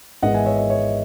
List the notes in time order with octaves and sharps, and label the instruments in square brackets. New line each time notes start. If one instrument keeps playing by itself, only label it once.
[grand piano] G#1 G#2 E3 G#3 B3 D#5 F#5
E5 G#5
C#5 E5
D#5
C#5